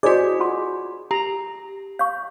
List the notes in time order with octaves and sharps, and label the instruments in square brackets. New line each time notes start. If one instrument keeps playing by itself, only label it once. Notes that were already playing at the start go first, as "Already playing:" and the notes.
[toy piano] E4 D5 D#5 [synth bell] F#4 D6 [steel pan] G#4 C5
[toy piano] F4 F#5 C6
[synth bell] G4 [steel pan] A#5
[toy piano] F5 C#6 [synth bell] G6